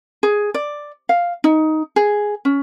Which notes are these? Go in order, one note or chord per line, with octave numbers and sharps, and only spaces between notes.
G#4
D5
F5
D#4
G#4
C#4